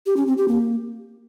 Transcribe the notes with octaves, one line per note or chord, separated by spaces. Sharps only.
G4
C#4
C4
G4
A#3